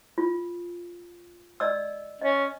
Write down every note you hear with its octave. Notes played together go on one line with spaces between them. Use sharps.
F4
D5 D#5 E6
C#4 D#5